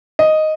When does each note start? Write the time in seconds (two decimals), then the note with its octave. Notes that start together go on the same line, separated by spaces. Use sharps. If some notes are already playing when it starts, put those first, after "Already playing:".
0.19 D#5